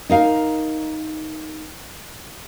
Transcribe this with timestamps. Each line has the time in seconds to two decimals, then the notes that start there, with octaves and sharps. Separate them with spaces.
0.09 D#4 A#4 F5